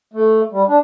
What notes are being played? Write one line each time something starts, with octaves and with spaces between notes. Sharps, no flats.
A3
G3
D4